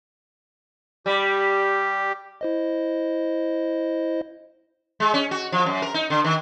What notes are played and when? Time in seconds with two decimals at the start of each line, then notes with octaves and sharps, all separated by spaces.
1.06 G3 G4
2.41 E4 C5 D#5
5.00 G#3
5.14 C#4
5.31 F#4
5.52 F3
5.66 F#2
5.82 A#4
5.94 D#4
6.10 D3
6.24 D#3